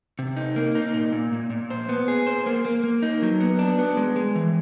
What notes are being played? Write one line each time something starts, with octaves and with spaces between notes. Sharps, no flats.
C3
D#4
A#3
D#4
A#2
A#2
A#2
A#2
C5
B3
G#4
C5
A#3
A#3
A#3
D#4
F#3
B3
D4
B3
G#3
G#3
E3